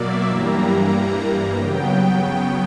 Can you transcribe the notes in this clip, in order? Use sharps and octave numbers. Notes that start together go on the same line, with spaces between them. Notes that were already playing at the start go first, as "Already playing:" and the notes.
Already playing: B2 F#3 A#3 D5 E5
G2 E3 G3 A#3 A#5
C#3 F#3 B3 G5